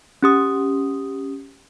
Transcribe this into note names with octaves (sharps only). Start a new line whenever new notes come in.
C#4 G4 D#6